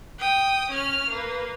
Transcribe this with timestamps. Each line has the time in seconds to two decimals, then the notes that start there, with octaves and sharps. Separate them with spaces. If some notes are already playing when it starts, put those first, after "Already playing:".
0.19 G5 D#6
0.71 C#4 F6
1.10 A#3 B4